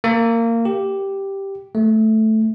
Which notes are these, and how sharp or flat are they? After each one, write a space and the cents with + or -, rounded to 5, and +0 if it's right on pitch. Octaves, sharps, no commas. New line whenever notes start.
A#3 -20
G4 +0
A3 -5